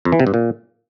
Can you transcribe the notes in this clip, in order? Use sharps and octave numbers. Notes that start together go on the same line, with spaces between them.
F2
E3
C3
G2
A#2